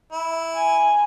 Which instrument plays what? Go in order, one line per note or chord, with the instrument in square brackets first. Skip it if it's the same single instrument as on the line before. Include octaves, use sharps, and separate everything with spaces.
[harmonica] E4
[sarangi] G#5